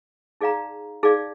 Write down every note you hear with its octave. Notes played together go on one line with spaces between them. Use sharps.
D#4 G#4 D5 F5 A#5
D#4 G#4 D5 F5